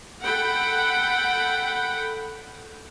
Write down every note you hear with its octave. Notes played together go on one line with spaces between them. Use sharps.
A4 F#5 G5 B5